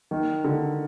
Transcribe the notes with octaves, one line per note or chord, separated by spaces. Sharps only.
D#3
D3